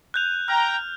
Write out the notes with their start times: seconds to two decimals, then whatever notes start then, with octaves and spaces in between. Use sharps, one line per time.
0.14 F#6 G6 F7
0.48 G5 A#5 F6